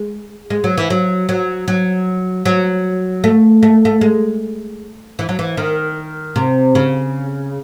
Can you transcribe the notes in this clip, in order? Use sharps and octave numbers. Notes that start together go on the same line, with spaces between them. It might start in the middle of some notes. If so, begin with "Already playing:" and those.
Already playing: G#3
G#3
F#3
E3
F#3
F#3
F#3
F#3
A3
A3
A3
G#3
E3
F#3
E3
D#3
C3
C#3